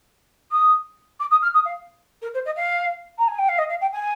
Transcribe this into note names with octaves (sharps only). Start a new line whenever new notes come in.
D#6
D6
D#6
F6
D#6
F5
A#4
C5
D#5
F5
A#5
G#5
G5
F5
D#5
F5
G5
G#5